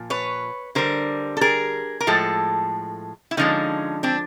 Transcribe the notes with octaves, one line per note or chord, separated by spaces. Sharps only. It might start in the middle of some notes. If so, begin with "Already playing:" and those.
Already playing: A#2 F3
B4 C#5
D3 G3 A#4 C5
A4
G#4 A#4
A#4
A2 F3 G#3 A4
E4
D3 F3 G#3 C#4 D#4
C4 D4